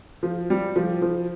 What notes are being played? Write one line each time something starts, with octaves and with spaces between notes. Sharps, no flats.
F3
G3
F3
F3